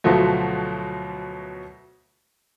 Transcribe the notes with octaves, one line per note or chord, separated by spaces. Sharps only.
D2 B2 F3 F#3 A3